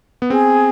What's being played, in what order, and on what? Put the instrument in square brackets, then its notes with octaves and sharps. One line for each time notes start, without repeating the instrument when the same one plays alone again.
[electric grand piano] B3
[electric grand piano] C4 [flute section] G#4